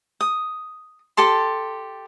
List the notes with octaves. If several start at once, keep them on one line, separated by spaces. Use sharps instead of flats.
D#6
G4 A4 A5 C6